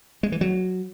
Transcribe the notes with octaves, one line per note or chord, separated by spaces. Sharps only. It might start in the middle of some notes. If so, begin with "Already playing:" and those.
G#3
E3
F#3